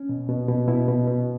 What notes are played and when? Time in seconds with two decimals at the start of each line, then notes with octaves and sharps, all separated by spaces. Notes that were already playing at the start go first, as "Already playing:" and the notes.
Already playing: C#4
0.09 B2
0.29 B2
0.49 B2
0.68 B2 E4
0.88 B2
1.08 B2